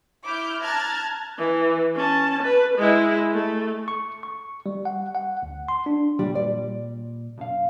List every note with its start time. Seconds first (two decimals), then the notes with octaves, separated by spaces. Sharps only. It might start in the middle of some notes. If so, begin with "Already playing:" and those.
0.24 E4 D6 F6 G6
0.61 A5 A#5 F6 F#6 G#6 A6
1.38 E3
1.96 C#4 A5
2.43 B4
2.77 G#3 E4
3.33 A3
3.88 C#6
4.23 C#6
4.66 G3
4.85 F#5
5.15 F#5
5.42 D2
5.68 C6
5.86 D4
6.19 A#2 G3
6.35 D5
7.38 B1 F#2 F5